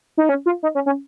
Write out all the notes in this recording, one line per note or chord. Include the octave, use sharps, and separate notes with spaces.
D#4
C#4
F4
D#4
C#4
C#4